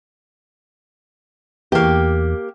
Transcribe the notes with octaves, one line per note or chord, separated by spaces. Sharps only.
E2 A#3 G4